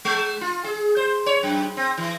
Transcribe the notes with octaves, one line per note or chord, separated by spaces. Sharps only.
G#3
F4
G#4
C5
C#5
F#2
C4
E3